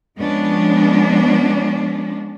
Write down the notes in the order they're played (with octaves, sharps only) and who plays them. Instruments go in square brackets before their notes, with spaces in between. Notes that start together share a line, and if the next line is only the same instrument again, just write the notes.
[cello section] F3 G#3 B3 C#4 D4